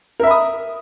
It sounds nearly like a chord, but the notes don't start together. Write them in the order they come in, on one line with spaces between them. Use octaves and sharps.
A#4 E5 B5 D#6